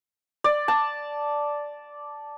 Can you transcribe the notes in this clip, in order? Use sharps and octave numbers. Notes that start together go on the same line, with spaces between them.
D5
A5